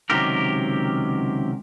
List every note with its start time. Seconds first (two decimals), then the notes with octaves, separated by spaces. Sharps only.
0.10 C#2 C3 D#3 F#3 G4 A#4